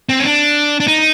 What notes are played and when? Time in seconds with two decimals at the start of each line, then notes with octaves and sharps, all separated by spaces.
0.09 C4
0.19 C#4
0.25 D4
0.80 D4
0.87 D#4